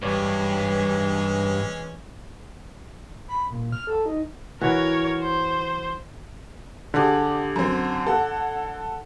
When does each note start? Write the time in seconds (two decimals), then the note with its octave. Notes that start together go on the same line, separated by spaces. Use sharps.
0.02 G2 E3 G#3 C#4 B4 C#5 D5
3.28 B5
3.50 A#2
3.72 F6
3.87 A4
4.06 D#4
4.61 E3 F#4 A#4 C#5
5.21 C5
6.94 D3 G4 G#4 D5
7.56 F#2 C4
8.07 A4 F#5